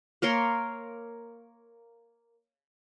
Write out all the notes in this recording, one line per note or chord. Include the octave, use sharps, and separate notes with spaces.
A#3 A#4 C#5 C6